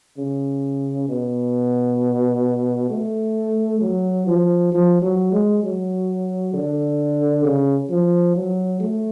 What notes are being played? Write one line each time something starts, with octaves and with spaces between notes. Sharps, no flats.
C#3
B2
A3
F#3
F3
F3
F#3
G#3
F#3
D3
C#3
F3
F#3
A3